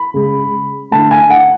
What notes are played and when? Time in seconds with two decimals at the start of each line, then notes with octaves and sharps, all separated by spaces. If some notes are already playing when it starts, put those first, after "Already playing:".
Already playing: B5
0.14 C#3 G#3
0.91 D3 A3 A5
1.11 G#5
1.30 F#5